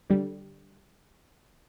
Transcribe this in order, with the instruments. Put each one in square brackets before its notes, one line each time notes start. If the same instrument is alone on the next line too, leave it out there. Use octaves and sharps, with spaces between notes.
[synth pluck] D3 G3